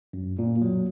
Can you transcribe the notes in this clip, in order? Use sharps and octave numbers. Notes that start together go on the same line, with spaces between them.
F#2
A#2
F#3